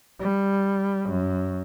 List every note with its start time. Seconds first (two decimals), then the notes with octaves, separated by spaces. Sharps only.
0.20 G3
1.09 F#2